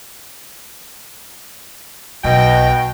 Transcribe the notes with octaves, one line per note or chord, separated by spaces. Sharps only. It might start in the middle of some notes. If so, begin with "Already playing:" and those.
B1 B2 D#5 G5